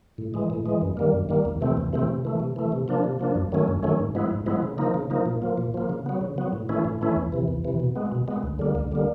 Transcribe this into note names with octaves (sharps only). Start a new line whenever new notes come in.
A2
E3 G#3
A2
E3 G#3
F#2
D#3 G3 A#3
F#2
D#3 G3 A#3
E2
C3 E3 A3 C4
E2
C3 E3 A3 C4
C3
E3 A3
C3
E3 A3
C3
F3 A#3 D4
C3
F3 A#3 D4
F#2
D#3 F#3 A3 C#4
F#2
D#3 F#3 A3 C#4
G#2
F3 G#3 B3 E4
G#2
F3 G#3 B3 E4
C#3
F3 A#3 D#4
C#3
F3 A#3 D#4
A#2
F3 A#3
A#2
F3 A#3
C#3
F#3 B3
C#3
F#3 B3
A2
E3 A3 C#4 E4
A2
E3 A3 C#4 E4
E2
C3 E3
E2
C3 E3
B2
G#3 B3
B2
G#3 B3
D2
D3 G3 A#3
D2
D3 G3 A#3